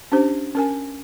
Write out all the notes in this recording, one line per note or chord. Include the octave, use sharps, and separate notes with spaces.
C#4 D4 G4 C5
C#4 A#4 G#5